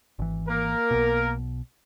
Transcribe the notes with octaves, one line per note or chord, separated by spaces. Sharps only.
G#1 E3
A#3 A#4
B1 B2